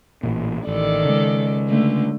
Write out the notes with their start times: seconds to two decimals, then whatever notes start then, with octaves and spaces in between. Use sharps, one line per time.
0.23 A1 A#2
0.67 A1 D#3 A4 D5
1.05 C#3 G#3
1.68 D3 A3